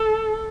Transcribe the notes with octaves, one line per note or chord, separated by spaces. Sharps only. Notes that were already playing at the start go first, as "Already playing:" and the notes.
Already playing: A4